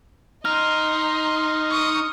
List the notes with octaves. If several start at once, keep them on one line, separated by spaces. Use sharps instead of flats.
D#4 D#5 C6 F6
C#6 D#6